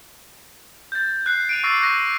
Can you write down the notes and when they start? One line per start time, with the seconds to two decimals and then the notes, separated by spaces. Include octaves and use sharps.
0.92 G6 A6
1.26 F#6 C7
1.49 D7 D#7 F7
1.63 C#6 D6 E6 A6 A#6 C7
1.80 F#6 G6 A#6 D#7